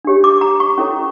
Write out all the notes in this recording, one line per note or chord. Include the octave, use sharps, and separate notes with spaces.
D4 G4 C#5
D6
A#5
C#6
C#4 E4 A4 C#5